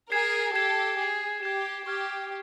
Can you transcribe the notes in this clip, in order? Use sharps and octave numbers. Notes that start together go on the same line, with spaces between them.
G#4 A#4 G#6 C7 E7
G4 A4 G#6 C7 E7
G#4 G#6 C7 E7
G4 G#6 C7 E7
G4 C#6 F6 G#6